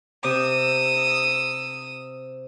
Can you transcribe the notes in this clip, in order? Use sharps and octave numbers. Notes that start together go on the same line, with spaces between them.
C3 D#6 E6